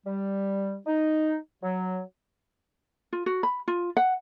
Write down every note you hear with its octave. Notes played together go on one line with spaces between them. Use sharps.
G3
D#4
F#3
F4
F#4
B5
F4
F#5